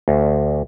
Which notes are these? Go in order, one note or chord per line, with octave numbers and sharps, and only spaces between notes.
D2